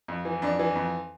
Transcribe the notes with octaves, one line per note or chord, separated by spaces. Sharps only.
F2
E3
F2 D4
E3
F2